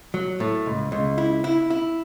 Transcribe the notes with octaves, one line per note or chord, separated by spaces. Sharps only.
F#3
A2
C#2
C#2
E4
E4
E4